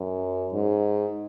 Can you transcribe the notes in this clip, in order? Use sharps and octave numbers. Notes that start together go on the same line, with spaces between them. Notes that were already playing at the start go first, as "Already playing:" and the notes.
Already playing: F#2
G#2